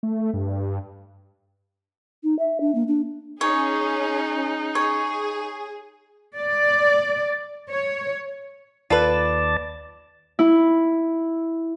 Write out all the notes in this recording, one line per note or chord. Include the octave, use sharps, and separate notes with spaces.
A3
G2
D#4
E5
D4
A#3
D4
C#4 D#4 G#4 C#5
G#4 C#5
D5
C#5
D#2 F4 A4 B4 D5 A5
E4